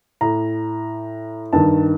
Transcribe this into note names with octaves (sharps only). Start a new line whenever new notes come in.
A2 A#5
G2 D#3 A5